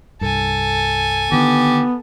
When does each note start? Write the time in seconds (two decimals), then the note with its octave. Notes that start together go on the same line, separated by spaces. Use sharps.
0.21 C2 G2 A4 G#5
1.32 D3 D#3 B3 G4